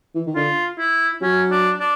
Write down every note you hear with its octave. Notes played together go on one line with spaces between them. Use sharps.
E3
D#3
D3 F4
E4
F#3 C#4
D4
D4